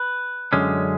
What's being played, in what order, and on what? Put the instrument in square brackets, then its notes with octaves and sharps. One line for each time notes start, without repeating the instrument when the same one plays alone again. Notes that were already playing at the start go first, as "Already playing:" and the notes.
Already playing: [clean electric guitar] B4
F#2 D3 G#3 C#4